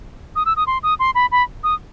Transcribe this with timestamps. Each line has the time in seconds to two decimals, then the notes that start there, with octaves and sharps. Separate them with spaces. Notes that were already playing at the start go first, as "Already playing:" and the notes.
0.36 D#6
0.46 E6
0.56 D#6
0.67 C6
0.83 D#6
1.00 C6
1.15 B5
1.32 B5
1.64 D#6